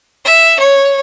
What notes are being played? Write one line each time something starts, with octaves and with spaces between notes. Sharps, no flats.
E5
C#5